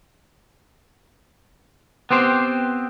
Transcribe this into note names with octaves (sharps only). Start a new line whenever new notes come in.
B3 C4 G4 C5